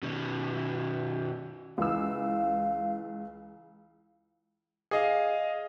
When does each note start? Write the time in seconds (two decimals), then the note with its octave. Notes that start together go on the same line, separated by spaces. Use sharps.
0.03 B2 D#3
1.78 C#2 E3 F5 E6
4.91 G#4 D#5 F5